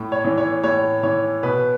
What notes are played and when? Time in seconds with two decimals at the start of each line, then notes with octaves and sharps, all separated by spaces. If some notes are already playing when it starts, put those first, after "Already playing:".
Already playing: A2
0.12 C#5
0.25 E3
0.38 C#5
0.64 A2 C#5
1.03 E3 C#5
1.43 B2 B4